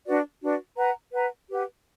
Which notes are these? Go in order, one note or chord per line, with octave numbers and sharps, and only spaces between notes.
D4 F#4 B4 D5
D4 F#4 B4 D5
B4 F#5 A#5
B4 F#5 A#5
G4 B4 F#5